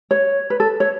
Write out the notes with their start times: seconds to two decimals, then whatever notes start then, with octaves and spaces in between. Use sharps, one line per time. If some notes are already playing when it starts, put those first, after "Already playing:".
0.11 C#5
0.50 B4
0.60 A4
0.80 C#5